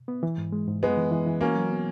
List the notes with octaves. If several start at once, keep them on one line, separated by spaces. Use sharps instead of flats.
B3
E3
G#2
G#3
G#2
F#2 G#3 B3
E3
E3
E3
A#3 C#4 F#4
F#3
B3